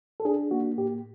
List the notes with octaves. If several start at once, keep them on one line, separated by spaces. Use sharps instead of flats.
A4
D4 G#4
A#3 F#4
A2 G4